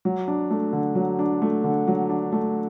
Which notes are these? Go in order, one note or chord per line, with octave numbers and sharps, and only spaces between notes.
F#3
D4
A3
D3
F#3
D4
A3
D3
F#3
D4
A3